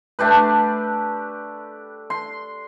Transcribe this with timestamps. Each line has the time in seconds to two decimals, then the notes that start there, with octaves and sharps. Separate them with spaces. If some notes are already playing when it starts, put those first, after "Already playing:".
0.19 A3 D4 G4 B4
2.10 C6